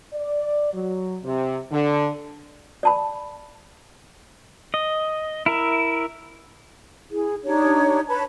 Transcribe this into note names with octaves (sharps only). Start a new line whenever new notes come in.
D5
F#3
C3
D3
D5 A5 B5
D#5
E4 A#4 E5
E4 G#4
D4 D#4 G4 C#5
B4 C#5 A5 B5